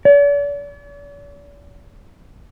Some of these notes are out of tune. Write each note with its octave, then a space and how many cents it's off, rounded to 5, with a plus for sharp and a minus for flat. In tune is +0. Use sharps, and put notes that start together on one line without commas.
D5 -45